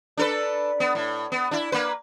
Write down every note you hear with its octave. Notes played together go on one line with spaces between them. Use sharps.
D4 A4 B4
B3
A2
B3
D4 E4
A#3 B4